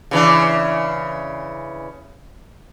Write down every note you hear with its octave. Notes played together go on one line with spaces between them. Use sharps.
C#3 E3 D4